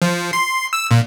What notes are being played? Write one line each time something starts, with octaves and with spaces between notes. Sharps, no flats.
F3
C6
E6
A#2